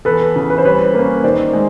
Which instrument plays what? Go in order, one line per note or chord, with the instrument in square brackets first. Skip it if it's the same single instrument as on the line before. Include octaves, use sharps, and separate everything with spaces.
[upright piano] E2 [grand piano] A4 B4
[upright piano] C#3 E3
[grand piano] B4
C5
[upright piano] G3 [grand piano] B4 C#5
[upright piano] A#3 C#4
[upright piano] D#3 [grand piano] C5 D5
[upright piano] G#3